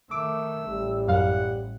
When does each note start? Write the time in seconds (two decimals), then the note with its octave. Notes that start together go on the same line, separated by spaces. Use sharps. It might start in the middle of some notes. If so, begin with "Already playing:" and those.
0.11 D#3 A3 D6 E6
0.69 A1 G3
1.08 F#2 F5 F#5